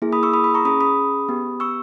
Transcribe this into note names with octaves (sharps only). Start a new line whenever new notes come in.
A#3 E4 G#4
B5 D#6
C#6 E6
B5 D#6
B5 D#6
A#5 C#6
C#4 G#4 B5 D#6
B5 D#6
B3 G4
C#6 E6